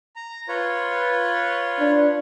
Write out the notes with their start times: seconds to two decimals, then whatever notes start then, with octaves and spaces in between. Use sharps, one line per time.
0.16 A#5
0.48 F4 B4 C#5
1.80 D4